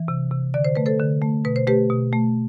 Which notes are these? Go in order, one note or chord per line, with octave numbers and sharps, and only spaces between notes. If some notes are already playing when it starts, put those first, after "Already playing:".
Already playing: E3
C3
C3
D3 D5
C5
A3 B4
A4 C5
D3
A3
B2 B4
C5
A3 G4 B4
B2
A3